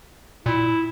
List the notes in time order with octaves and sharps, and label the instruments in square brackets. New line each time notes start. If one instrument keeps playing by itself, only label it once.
[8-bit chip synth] A#2 [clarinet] E4